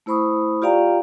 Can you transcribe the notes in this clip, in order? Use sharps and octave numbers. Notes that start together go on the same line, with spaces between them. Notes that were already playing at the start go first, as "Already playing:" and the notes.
A3 E4 C5 B5 C#6 D#6
F4 G4 D5 F5 G5 A#5